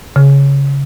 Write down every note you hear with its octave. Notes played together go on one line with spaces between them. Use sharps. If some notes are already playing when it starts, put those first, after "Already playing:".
C#3